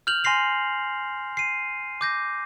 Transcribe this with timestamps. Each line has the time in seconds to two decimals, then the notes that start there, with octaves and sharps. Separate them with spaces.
0.07 F6 G6 F7 F#7
0.24 G#5 C6 A#6 C7 F7
1.37 C7 D#7
2.01 D6 G6 A#6